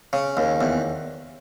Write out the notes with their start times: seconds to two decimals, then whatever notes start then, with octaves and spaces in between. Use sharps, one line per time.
0.13 C#3
0.37 D#2
0.61 E2